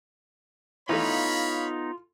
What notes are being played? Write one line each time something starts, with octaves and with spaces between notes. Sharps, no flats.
E3 A3 B3 D#4 F4 C#5 F5 B5